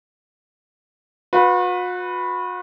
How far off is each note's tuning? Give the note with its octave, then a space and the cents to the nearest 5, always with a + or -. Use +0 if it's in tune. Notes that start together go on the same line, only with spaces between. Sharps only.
F#4 -45 B4 +0